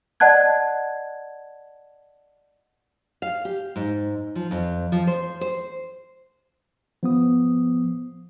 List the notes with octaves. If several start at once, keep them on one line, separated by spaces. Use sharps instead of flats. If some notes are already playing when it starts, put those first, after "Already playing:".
D5 D#5 F#5 A5 F#6 G#6
F5
G4
G#2
F3
F2
F3
C5
C5
F3 B3 D#6